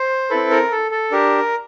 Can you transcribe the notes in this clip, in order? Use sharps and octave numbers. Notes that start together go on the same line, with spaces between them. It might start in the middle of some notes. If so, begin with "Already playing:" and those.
Already playing: C5
C4 E4 A4 B4
A#4
A4
A4
D4 G4 A#4